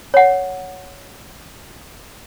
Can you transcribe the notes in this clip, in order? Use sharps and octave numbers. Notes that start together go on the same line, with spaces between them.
C#5 F#5